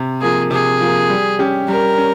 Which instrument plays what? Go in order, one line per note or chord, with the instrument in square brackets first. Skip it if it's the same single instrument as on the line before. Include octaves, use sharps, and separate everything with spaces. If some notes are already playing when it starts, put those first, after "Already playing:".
Already playing: [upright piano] C3
[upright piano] F3 A#3 [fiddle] G#4
[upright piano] C3 [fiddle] G#4
[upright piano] F3 A#3
G3
C#4 G4
[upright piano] G3 [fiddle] A#4
[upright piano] C#4